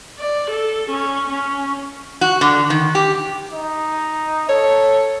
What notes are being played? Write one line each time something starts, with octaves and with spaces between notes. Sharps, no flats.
D5
A4
C#4
C#4
F#4
D3
D#3
G4
D#4
A4 C#5